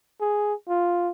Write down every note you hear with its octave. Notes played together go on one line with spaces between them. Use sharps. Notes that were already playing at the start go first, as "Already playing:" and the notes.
G#4
F4